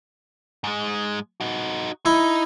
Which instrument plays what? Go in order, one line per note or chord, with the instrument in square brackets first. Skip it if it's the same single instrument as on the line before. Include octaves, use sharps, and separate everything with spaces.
[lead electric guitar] G#2 G#3
D#4 F#4
[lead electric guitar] D#4 [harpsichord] E4